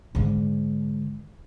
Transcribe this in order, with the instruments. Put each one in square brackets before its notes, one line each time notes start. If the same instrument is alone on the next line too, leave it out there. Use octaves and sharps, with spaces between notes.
[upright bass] G#2 D3